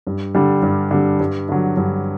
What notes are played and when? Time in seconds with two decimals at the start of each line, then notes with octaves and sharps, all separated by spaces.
0.07 G2
0.35 D3 G3
0.63 G2
0.91 D3 G3
1.20 G2
1.49 D3 F#3
1.77 G2